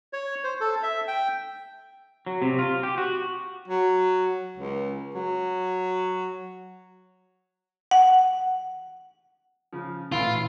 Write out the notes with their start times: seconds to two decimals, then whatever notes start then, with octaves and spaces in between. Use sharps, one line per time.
0.13 C#5
0.44 C5
0.60 A4
0.83 E5
1.08 G5
2.26 F#3
2.42 C3
2.59 F4
2.83 G4
2.98 F#4
3.68 F#3
4.57 C#2
5.15 F#3
7.91 F#5
9.73 C#3 F3
10.12 A1 A#2 E3 F4 B5 D7